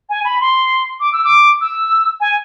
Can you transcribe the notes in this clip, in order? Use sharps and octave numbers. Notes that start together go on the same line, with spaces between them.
G#5
B5
C6
D6
E6
D6
E6
G#5